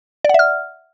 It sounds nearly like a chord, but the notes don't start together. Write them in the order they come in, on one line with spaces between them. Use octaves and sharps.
D5 F#5 E5 F6